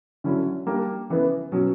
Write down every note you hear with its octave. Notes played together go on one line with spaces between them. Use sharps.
D3 F#3 C#4 E4
G3 A#3 D4
C#3 E3 B3
B2 F#3 C#4